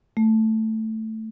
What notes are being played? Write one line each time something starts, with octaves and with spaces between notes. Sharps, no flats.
A3